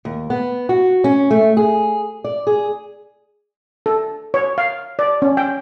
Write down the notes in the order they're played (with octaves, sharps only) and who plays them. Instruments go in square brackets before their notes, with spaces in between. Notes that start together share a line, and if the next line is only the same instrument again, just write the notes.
[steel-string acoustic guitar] D#2
B3
F#4
C#4
A3
G#4
D5
G#4
[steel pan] A4
C#5
F5
D5
C#4
G5